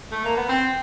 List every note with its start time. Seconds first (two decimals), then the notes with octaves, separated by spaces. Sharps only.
0.12 A3
0.25 A#3
0.37 B3
0.49 C4